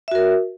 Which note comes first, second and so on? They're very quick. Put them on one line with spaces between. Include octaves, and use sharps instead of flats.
E5 F#4 A#4